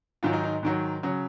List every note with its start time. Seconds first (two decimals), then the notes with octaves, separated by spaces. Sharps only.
0.23 G#2 D#3 F#3 F4
0.33 D#4
0.43 D#4
0.63 G#2 D#3 F#3
1.03 C#3 F#3